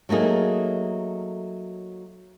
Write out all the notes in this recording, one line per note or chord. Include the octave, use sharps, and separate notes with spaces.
F#3 A3 A#3 D#4 G#4